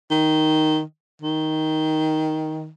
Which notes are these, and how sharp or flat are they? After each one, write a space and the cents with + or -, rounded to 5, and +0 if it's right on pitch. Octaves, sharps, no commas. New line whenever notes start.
D#3 +0
D#3 +10